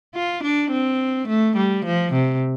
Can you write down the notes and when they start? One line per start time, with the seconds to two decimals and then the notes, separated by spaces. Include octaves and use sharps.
0.15 F4
0.43 D4
0.71 C4
1.28 A3
1.56 G3
1.85 F3
2.13 C3